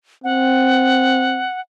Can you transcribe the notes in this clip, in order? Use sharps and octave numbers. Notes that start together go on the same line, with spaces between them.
C4 F#5